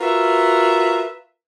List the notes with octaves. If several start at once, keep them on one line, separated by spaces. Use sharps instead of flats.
F4 F#4 A#4 B4 E5